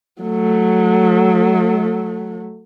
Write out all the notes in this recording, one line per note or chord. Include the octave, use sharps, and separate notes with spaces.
F#3 A3